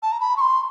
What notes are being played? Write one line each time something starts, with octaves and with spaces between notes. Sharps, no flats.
A5
A#5
B5
C#6
C6